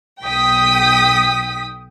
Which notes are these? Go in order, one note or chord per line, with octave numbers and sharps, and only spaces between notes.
B1 G5 D#6 B6